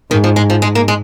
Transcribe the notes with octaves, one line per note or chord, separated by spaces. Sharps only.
G#2 D#3
F3
G#3
F3
G#3
A#3
G#3